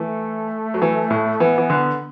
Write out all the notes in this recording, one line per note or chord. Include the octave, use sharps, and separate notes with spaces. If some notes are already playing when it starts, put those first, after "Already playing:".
Already playing: E3 A3
F#3
E3
A2
E3 B3
E3
D3